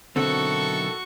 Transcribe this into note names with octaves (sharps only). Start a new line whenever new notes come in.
B1 D3 D#3 C4 E4 F#4 A4 C#6